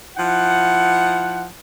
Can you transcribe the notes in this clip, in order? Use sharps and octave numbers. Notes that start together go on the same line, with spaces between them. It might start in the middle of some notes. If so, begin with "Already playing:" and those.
F3 E4 F#5